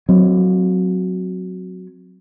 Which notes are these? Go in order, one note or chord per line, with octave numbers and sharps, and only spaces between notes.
F#3 C4